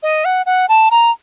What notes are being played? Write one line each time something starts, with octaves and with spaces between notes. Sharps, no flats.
D#5
F#5
F#5
A5
A#5